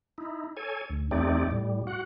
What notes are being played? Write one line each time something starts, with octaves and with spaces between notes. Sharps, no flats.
D#4 E4
A4 C#5 G#5
D2
E2 A3 C4 D#4 G4 D5
A2 G3
F#4 F#5